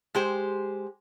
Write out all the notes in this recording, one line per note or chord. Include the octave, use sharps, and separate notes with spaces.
G#3 G4 C5